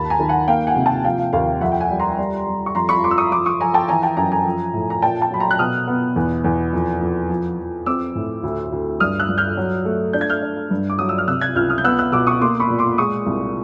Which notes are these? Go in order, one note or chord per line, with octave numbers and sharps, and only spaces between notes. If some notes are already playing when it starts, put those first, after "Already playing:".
Already playing: D#2 A5 B5
G#5 A#5
D#3
F#5 G#5
A#3 F5 G5
F#5 G#5
C3
G5 A5
F3 F5 G5
F5
D#2 F5
F5
F2 E5 F#5
G5
F#5 G#5
G3
A#5 C6
G3
G3
C#6
F2 A#5 C6
B5 C#6
F3 C6 D6
E6
C#6 D#6
F3 C6 D6
C#6 D#6
F3 G#5 A#5
G5 A5
E3 G#5 A#5
G5 A5
F#2 G#5 A#5
G#5 A#5
F3
A2
A#5
A#2 G5 A5
G5 A5
F#3 B5
A#5 C6
F#6
B2 D#6 F6
B3
E2
E2
F2
F2
F3
F3
C4 D6 E6
A2
D2
D2
G2 D#6 F6
E6 F#6
G2
F6 G6
F#3
A3
D4 G6
G#6
F6 G6
D4
G2
D6
F#3 D#6
E6
F6
C3 E6 F#6
F#6 G#6
C#2 F6 G6
D#6 F6
G6
B3 E6 F#6
E6 F#6
B2 D6 E6
C#6 D#6
A#3 C6 D6
B5 C#6
A#2
C6 D6
G#3 C#6 D#6
C2